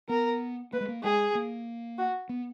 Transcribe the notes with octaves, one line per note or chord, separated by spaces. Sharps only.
B3 A#4
A#3 B4
G#3
A#3
G#3 G#4
A#3
F#4
B3